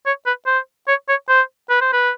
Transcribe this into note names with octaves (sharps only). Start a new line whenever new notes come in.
C#5
B4
C5
C#5
C#5
C5
B4
C5
B4